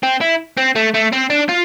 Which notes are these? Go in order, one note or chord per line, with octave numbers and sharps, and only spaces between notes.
C4
E4
C4
A3
A3
C4
D4
F4